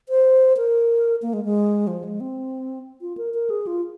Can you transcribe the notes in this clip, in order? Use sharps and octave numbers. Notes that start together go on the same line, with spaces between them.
C5
A#4
A#3
G#3
G#3
F3
G#3
C4
F4
A#4
A#4
G#4
F4